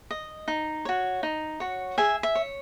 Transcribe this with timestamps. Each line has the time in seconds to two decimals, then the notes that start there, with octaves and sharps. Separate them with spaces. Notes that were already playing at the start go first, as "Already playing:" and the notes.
0.11 D#5
0.48 D#4
0.85 F#4 C#5
1.23 D#4
1.60 F#4 C#5
1.98 G#4 E5 G#5
2.23 E5
2.35 C#5